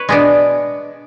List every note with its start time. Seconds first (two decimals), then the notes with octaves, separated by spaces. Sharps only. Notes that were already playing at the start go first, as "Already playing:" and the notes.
Already playing: B4 C#5
0.09 B2 G#3 B3 D4